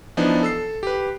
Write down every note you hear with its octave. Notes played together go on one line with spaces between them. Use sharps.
E3 F3 B3 D4 D#4
A4 E6 C7
G4 B4